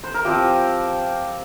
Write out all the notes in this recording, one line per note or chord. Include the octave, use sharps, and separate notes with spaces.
C5
A#4
F3 C4 F4 G4